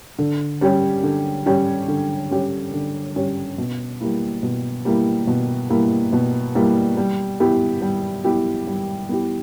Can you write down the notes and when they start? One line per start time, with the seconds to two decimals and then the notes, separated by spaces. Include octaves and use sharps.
0.19 D3
0.61 G3 C#4 G4 C#5
1.03 D3
1.46 G3 C#4 G4 C#5
1.88 D3
2.31 G3 C#4 G4 C#5
2.73 D3
3.16 G3 C#4 G4 C#5
3.58 B2
4.00 G3 A#3 E4
4.43 B2
4.85 G3 A#3 E4
5.27 B2
5.69 G3 A#3 E4
6.13 B2
6.55 G3 A#3 E4
6.97 G3
7.40 B3 E4 G4
7.82 G3
8.24 B3 E4 G4
8.67 G3
9.09 B3 E4 G4